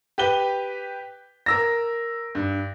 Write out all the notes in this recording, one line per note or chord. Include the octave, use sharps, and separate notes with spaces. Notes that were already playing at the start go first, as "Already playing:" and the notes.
G4 B4 G7
A#4 E6 A#6
G2